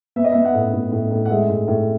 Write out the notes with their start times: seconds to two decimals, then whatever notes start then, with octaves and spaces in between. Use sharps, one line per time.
0.16 B3 E5
0.24 D#5
0.32 B3 E5
0.45 F#5
0.54 A2
0.73 A2
0.92 A2
1.11 A2
1.25 F#5
1.30 G#3 E5
1.49 A2
1.68 A2